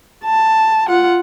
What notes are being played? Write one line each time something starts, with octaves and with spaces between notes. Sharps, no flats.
A5
F4 F#5